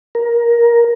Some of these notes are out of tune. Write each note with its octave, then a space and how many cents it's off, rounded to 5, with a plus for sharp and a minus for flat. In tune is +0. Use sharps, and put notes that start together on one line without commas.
A#4 +15